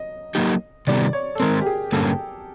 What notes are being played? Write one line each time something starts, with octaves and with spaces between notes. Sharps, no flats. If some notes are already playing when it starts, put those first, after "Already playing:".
Already playing: D#5
F#3 A#3 D#4 G4
C3 D#3 G3 B3 D5
C#5
A4
D#3 G#3 C4 A#4
G4
G#4
G2 D3 G3 A#3 C#4 A4